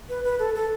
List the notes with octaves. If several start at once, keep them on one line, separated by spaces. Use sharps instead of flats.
B4
B4
A4
A4